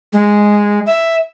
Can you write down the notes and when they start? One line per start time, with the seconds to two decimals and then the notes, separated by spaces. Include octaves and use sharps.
0.13 G#3
0.86 E5